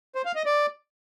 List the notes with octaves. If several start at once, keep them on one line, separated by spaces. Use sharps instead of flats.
C5
F5
D#5
D5